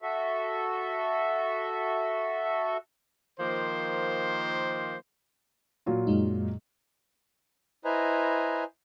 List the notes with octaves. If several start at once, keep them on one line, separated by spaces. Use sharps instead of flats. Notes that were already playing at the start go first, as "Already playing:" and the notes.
F#4 A4 E5
D#3 F3 A#3 C5
A#2 F#3 F4
F#2 G#3 D#4
E4 B4 C5 D#5 G#5 A#5